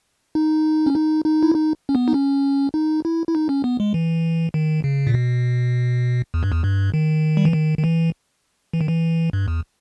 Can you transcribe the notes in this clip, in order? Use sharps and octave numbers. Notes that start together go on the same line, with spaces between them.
D#4
C#4
D#4
D#4
E4
D#4
C#4
B3
D#4
C#4
D#4
E4
E4
D#4
C#4
B3
G#3
E3
D#3
C#3
A#2
B2
E2
G2
E2
G2
D#3
G3
E3
D#3
D#3
E3
E3
D#3
E3
G2
E2